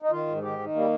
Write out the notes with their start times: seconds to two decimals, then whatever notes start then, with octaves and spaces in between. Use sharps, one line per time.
0.02 D#4
0.11 D#3 F4
0.27 G#2
0.43 D#3 G4
0.59 D#3
0.75 G3 A#3